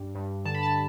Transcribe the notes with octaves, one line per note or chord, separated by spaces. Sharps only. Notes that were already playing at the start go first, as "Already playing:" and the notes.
Already playing: G2
G2
D3 A5
B5
A5